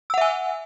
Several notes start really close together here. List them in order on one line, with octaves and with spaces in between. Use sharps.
E6 F#5 E5 G#5